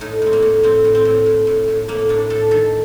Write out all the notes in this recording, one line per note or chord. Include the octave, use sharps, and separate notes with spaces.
A2 D#4
A2 C4
A#3
A2
A2 C4
A2
C4
A2
A2
A2
A2
A2 A#3
A2 D4
A2 A4
D#3 A4